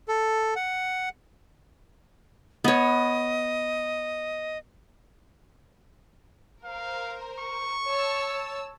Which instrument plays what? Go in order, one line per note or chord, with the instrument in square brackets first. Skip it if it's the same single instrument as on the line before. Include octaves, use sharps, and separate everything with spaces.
[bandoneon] A4
F#5
[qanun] B3 C#5 [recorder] D#5
[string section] A#4 C5 [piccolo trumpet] F5
[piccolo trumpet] C#6
[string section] C#5 A5 E6